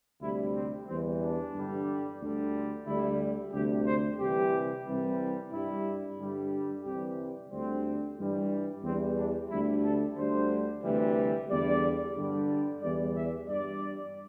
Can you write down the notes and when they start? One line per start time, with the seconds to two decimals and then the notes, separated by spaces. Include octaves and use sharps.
0.20 D2 C3 G3 E4
0.54 C4
0.87 E2 E3 G3 C4
1.20 D4
1.53 G2 D3 G3
2.20 D2 D3 G3
2.86 D2 D3 G3 E4
3.52 D2 C3 G3 G4
3.86 C5
4.19 C2 C3 E3 G4
4.85 C2 C3 E3 G3
5.51 G2 G3 E4
6.18 G2 D3 G3
6.84 C2 C3 E3 G3 G4
7.50 D2 D3 G3 C4
8.18 G2 E3 G3
8.84 E2 E3 G3 C4
9.17 D4
9.50 D2 D3 G3 E4
9.84 A4
10.17 D2 D3 G3 C5
10.83 D2 C3 E3 G3
11.49 E2 D3 G3 D5
12.16 G2 D3 G3
12.82 E2 E3 G3 D5
13.15 E5
13.48 G2 G3 D5